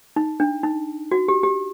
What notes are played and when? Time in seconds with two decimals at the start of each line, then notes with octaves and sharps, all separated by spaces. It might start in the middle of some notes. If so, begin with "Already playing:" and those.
0.16 D#4
0.40 D4
0.63 D#4
1.11 F#4
1.28 G4
1.43 G4